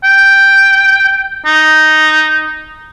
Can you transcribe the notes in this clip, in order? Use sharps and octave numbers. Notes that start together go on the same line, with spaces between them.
G5
D#4